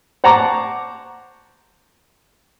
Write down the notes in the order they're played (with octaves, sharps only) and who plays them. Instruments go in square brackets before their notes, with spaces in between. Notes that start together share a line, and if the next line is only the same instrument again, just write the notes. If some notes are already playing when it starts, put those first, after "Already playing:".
[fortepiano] C5 F#5 A5 A#5 C#6 D6